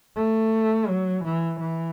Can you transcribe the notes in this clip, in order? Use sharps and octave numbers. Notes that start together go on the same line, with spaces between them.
A3
F#3
E3
E3